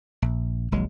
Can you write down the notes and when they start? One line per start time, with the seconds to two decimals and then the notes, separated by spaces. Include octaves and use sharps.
0.22 A#1
0.72 D#1 A#1 F#3 G#3